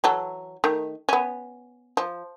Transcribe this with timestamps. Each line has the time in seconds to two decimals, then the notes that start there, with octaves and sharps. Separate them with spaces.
0.04 E3 F#3 A4
0.64 D#3 A3
1.09 B3 C#4
1.97 F3